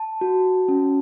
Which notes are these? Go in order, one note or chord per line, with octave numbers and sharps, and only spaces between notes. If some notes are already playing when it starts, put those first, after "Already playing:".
Already playing: A5
F#4
C#4